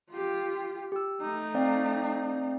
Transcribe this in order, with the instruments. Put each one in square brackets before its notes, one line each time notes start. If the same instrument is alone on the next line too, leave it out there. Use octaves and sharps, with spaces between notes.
[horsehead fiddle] F4 G4
[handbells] G4 E6
[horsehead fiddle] A3 D#4
[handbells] C4 D5 F5